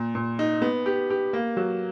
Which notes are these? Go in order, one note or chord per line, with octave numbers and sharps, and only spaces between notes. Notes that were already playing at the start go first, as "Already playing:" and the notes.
Already playing: A#2
A#2
D#4
B3
G4
G4
A#3
F#3